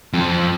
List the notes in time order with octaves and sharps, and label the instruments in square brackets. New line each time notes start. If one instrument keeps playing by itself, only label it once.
[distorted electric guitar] F2